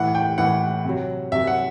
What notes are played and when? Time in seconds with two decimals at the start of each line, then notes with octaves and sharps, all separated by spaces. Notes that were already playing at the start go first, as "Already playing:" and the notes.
Already playing: A2 E3 F#5
0.15 G5
0.38 A2 E3 F#5
0.85 C3 F#3
1.32 C3 F#3 E5
1.47 F#5